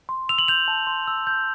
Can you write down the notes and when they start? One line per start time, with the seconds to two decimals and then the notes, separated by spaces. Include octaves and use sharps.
0.09 C6
0.29 E6 F7
0.38 F#7
0.48 G6 F7
0.68 A5
0.87 C6
1.07 E6
1.27 G6